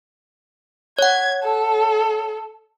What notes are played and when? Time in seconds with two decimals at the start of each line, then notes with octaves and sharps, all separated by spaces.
0.99 C#5 F#5 G#6
1.44 A4